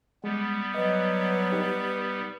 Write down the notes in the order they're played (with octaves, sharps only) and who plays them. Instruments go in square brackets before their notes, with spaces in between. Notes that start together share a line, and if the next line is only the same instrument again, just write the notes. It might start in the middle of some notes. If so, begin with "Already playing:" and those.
[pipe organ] G3 B3 [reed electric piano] G#3
[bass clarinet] F#3 [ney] B4 [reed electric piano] D#5
[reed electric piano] D#4 G4